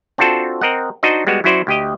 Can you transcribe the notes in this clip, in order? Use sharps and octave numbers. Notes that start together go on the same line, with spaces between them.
C4 D4 F4 F#4 A4 C5
C4 A#4 D#5 F#5
D4 D#4 F#4 C5 D#5
G3 G#3 B3 F#4
F#3 C#4 E4 F#4 C5 D5
D2 G4 D#5